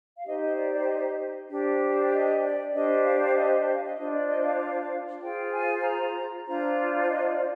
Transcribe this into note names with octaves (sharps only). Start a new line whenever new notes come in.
F5
D#4 G4 C5 D#5
D#5
D5
D5
D#5
D4 G4 C5
D#5
D5
D4 G4 C5 D#5
F5
F5
D#5
D#5
F5
D#5
D4 F4 C5 D#5
D5
D#5
F5
F4 G#4 C5 G5
G#5
A#5
D4 F4 C5 A#5
D#5
D5